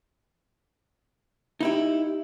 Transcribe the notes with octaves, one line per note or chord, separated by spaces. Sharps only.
D#4 E4 G4